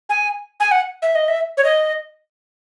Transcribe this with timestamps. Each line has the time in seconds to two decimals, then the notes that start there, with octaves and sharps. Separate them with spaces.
0.09 G#5
0.60 G#5
0.72 F#5
1.02 E5
1.15 D#5
1.28 E5
1.57 C#5
1.64 D#5